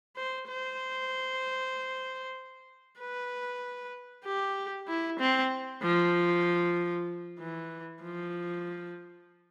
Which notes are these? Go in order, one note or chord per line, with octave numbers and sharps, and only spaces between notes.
C5
C5
B4
G4
E4
C4
F3
E3
F3